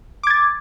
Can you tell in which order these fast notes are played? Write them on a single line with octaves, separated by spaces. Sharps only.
D6 G#6 A6